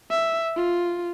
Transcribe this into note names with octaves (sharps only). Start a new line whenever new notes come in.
E5
F4